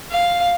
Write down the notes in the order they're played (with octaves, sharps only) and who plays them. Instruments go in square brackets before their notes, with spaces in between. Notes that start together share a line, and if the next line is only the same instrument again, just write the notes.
[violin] F5